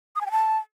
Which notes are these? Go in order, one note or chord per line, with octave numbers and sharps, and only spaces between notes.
D#6
G#5
G5
A5